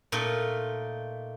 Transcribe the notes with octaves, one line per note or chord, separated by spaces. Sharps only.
A#2 A3 D#4